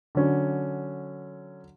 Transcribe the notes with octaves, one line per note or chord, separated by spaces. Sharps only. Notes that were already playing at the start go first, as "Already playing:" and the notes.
D3 F#3 C#4